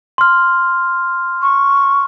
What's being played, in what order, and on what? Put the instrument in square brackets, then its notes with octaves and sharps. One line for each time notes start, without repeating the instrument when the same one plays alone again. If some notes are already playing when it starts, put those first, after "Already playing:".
[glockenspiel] C6 F6
[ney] C#6